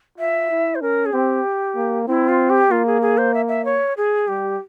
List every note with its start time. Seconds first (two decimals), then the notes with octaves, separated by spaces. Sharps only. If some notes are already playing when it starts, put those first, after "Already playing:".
0.18 F4 E5
0.50 E4
0.75 C5
0.82 C#4 A#4
1.06 G#4
1.13 C4 G4
1.76 A#3
2.08 C4 E4
2.29 F4
2.50 G4
2.71 A#3 F4
2.86 G#4
3.02 G#4
3.18 C5
3.34 E5
3.48 E5
3.65 C#5
3.97 G#4
4.28 G3 G4